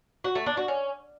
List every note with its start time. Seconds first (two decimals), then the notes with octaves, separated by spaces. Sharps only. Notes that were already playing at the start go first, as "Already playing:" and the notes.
0.24 F#4
0.35 A3
0.46 D4
0.57 F#4
0.68 C#4